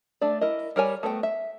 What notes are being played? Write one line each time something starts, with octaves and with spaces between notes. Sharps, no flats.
A3 D4 D5
E4 A#4 D#5
G3 A#4 C#5 G#5
A3 B3 F#4 C5 G5
E5